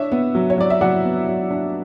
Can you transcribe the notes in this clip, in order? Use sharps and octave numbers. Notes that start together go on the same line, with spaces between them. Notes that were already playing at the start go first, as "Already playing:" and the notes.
Already playing: D4 C#5 E5
B3
F#3
C#5
F#3 D5
E5
F#3 D5 F#5
B3
F#3
D4